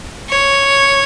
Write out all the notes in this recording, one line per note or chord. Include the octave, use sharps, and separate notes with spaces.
C#5